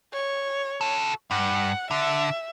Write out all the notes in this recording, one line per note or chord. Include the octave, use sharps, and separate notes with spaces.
C#5
F#4 A4
G2 F#5
D3 E5